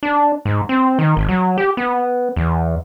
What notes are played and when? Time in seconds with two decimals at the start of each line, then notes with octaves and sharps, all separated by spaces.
0.03 D4
0.45 G#2
0.69 C4
0.99 D#3
1.17 G#1
1.29 F#3
1.58 G4
1.77 B3
2.36 E2